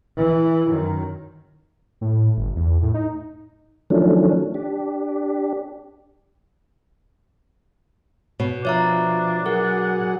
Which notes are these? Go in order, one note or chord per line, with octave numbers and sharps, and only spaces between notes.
E3 E4
F#2 D#3
A2
G1
E2
A2
D#4
D#3 F3 F#3 A3 C#4 D4
D4 G4
B2 C#5
F3 D4 C#5 E5 A#5
F#3 G#4 A#4 F#5